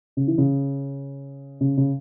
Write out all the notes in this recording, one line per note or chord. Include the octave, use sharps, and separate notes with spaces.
C#3
E3
C#3
C#3
C#3